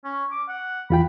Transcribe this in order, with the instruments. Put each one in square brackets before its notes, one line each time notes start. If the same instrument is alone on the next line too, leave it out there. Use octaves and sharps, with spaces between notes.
[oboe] C#4
D6
F#5
[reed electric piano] E2 F4 G5 [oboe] B5